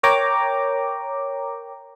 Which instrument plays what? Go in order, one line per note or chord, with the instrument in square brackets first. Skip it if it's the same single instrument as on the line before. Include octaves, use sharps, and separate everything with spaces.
[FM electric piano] A#4 C#5 G5 A#5 D6